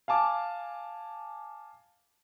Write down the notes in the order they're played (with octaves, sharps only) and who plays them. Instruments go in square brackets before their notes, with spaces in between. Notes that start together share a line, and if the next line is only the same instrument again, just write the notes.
[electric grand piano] F5 G#5 A5 D6